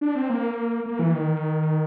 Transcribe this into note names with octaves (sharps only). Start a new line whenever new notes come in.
D4
C4
A#3
A#3
E3
D#3